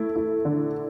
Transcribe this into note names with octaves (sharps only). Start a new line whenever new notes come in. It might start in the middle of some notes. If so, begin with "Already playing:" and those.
Already playing: A3 E4
E4
D3